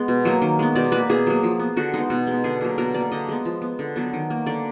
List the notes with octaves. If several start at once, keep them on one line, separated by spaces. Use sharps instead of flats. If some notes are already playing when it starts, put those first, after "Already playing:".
Already playing: G#3 B3
B2
F#3 A#3
D#3
G#3 B3
B2 D5
A#3 B4
B2 G#4
F#3 A#3
F3
B3
D3 F#4
G#3 B3 D#4
B2 F#4
G#3 B3
D3 G#4
F#3 A#3
B2 A#4
A#3 D5
D3 D#5
G#3 B3
F3
B3
D3
F#3 B3
D#3
A#3
D3 D5